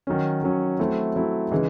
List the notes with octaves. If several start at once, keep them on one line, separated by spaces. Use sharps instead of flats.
D#3 F#3 C#4
D#3 F#3 C#4
F#3 A3 C4 E4
F#3 A3 C4 E4
C#3 E3 G#3 D#4